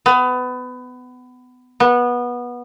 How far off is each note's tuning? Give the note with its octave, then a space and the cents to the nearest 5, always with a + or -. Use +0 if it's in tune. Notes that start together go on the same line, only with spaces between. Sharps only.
B3 +25
B3 -20